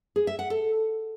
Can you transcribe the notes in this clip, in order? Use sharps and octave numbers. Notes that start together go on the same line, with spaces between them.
G#4
E5
F#5
A4